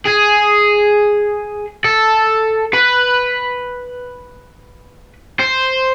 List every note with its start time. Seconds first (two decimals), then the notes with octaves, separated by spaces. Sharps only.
0.07 G#4
1.85 A4
2.73 B4
5.40 C5